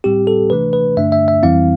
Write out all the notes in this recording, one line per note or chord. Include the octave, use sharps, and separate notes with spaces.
A2 G3 C4 G4
A4
C3 E3 A3 D4 B4
B4
G2 D3 A3 D4 E5
E5
E5
F2 E3 G3 C4 E4 F5